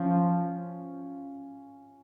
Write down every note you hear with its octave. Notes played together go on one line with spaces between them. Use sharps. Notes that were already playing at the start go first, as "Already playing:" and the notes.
Already playing: F3 C#4 F4